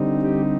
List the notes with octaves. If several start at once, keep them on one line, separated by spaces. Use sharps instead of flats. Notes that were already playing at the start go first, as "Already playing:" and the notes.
Already playing: D3 G3 C4 D#4
G4